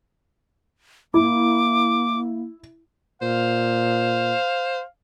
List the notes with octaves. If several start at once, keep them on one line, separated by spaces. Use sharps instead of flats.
A#3 E4 D6
A#2 C5 F5